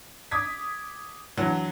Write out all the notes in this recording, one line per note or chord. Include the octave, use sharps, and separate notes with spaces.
D6 D#6 G#6 B6
D3 E3 F#3